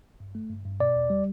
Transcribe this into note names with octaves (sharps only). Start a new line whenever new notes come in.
G2
A3
G2
G2
B2 D5
E2
G3